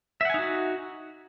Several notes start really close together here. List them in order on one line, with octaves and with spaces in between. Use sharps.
E5 F#5 G#5 D#4 F#4